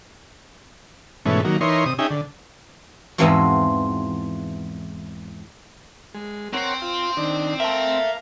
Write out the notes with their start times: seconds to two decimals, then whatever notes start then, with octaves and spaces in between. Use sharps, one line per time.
1.26 G#2 B2 E3 A3 C#4
1.44 D#3 F#3 A#3
1.61 E3 D#4 A#4 C#5 C6
1.86 C3 D#6
1.99 C#4 D#4 G#4 E5 G5
2.10 D3
3.18 E2 G#2 E3 F3 C4 F#4
6.15 G#3
6.54 C4 A#4 C5 C#5 F#5
6.82 F4
7.17 D#3 D4
7.60 A#4 E5 F5 A5